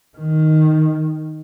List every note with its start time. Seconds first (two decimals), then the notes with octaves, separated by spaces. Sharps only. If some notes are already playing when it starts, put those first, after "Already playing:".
0.17 D#3